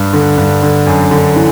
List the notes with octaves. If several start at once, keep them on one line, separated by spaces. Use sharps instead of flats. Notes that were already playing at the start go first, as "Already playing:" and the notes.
Already playing: G2
D3
G2
D3
F#2
D3
E3